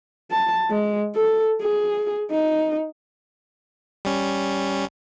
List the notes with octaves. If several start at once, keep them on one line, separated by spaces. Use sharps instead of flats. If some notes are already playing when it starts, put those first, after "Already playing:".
A5
G#3
A4
G#4
D#4
G3 C#4